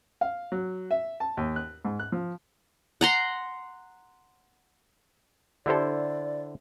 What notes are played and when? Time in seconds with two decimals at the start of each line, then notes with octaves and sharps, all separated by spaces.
0.21 F5
0.52 F#3
0.91 E5
1.20 A5
1.37 D#2
1.56 F#6
1.85 G#2
1.99 F#6
2.12 F3
3.01 F#5 A#5 C6
5.66 D3 D4 E4 G4 A4 C5 D5